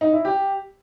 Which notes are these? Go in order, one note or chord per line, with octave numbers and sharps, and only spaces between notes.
D#4
E4
G4